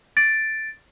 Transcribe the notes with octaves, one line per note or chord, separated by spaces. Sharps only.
A6 D7